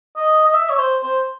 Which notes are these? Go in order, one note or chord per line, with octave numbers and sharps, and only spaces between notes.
D#5
D#5
E5
C#5
C5
C5